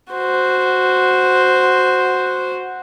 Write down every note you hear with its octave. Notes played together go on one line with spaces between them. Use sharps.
F#4 C5